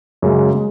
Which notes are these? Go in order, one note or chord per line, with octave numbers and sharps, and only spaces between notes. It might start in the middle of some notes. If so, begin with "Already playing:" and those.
F#2 C#3 G#3
G#3